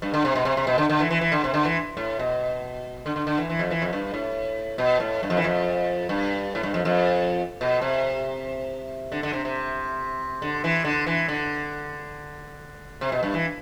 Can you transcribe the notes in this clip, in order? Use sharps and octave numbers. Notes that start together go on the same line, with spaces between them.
G2
D3
C3
B2
C3
C3
B2
D3
D3
E3
E3
E3
D3
C3
D3
E3
A2
B2
D3
D3
D3
E3
E3
F2
E3
F2
G2
A2
B2
A2
G2
F2
E3
F2
G2
A2
G2
F2
F2
B2
C3
D3
D3
C3
C3
D3
E3
D3
E3
D3
C3
B2
G2
E3